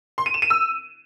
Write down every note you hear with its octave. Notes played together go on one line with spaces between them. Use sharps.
C6
D#7
E7
D#7
E6